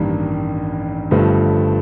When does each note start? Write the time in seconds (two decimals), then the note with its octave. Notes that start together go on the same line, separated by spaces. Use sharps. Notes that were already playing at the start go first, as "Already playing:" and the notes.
Already playing: A1 G2 D#3 G3 A#3
1.11 G1 G2 F3 A3